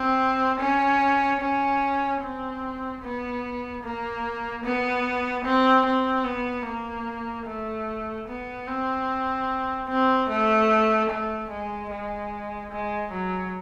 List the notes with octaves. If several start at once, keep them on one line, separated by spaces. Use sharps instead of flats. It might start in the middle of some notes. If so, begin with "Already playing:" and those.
Already playing: C4
C#4
C#4
C4
B3
A#3
B3
C4
C4
B3
A#3
A3
B3
C4
C4
A3
A3
G#3
G#3
G#3
F#3